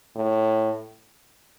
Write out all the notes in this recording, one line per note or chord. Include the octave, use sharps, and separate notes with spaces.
A2